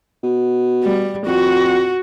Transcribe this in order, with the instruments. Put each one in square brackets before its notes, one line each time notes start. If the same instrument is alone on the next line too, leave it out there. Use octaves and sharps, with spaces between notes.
[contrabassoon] B2
[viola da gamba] G3
[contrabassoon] F2 [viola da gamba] F#4